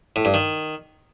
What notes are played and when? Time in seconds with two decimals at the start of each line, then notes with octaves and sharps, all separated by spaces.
0.16 A2
0.25 G2
0.34 D#3